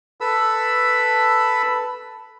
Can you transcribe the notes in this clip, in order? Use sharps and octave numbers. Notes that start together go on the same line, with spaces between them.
A4 B4 B5 E6